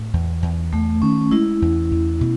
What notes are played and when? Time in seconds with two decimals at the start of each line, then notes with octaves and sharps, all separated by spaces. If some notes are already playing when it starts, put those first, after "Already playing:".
Already playing: A2
0.14 E2
0.42 E2
0.73 E2 A3
1.02 D#3 C#4
1.31 G#3 E4
1.62 E2
1.91 E2
2.21 B2